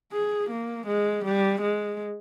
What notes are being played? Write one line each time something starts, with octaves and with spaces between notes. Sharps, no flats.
G#4
A#3
G#3
G3
G#3